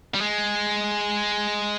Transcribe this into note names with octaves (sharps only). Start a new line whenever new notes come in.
G3
G#3